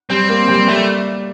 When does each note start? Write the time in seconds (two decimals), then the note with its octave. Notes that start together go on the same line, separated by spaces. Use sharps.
0.10 G3 C4
0.29 A#3
0.48 G3
0.68 G3 A3